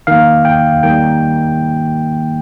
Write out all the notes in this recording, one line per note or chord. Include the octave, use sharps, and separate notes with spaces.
D#3 A#3 F5
G5
D#3 G3 A#3 G5